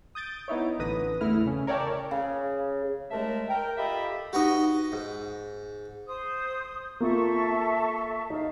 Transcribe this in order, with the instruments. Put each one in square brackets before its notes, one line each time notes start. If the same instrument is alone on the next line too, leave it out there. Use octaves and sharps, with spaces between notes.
[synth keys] D#6 G6 A6 D7
B3 D#4 E4 C#5
A1 D3 B4 D#6 A#6
E2 A3 E4 F6
C#3 C#4
A#4 C#5 D5 E5 G5 A5
[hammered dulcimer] C#3
[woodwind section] D#2 G#3 A3 A#4 E5 A5
A#4 G5
F4 G4 A4 D#5 E5 B5
[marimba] D#4 G4 [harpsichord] F#4 B4 D#5
[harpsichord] G#2
[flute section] C5 D#6
[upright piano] A#3 F4 [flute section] A4 E5 C#6
[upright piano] D#4 [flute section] F5